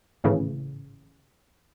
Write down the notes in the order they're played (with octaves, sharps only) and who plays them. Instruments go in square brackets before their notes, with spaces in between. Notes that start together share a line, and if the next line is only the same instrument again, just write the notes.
[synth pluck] G#1 A2 C#3 E3